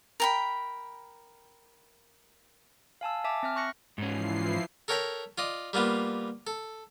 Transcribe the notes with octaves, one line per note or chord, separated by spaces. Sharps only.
A#4 G5 B5
F5 G#5 A5 E6
E5 G#5 A5 D6
C4 E5 F6
C#6 F#6 A#6 C#7
G#2 E3 F3 C#4 C7
A4 A#4 C#5 G5 A#5 B5
F4 D5 D#5
G3 A#3 B3 F4
A4